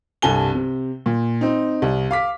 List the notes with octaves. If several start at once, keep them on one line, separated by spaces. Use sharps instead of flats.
C2 G2 A4 G#5 G7
C3
A#2
C4 D#4
C2
F5 D6 B6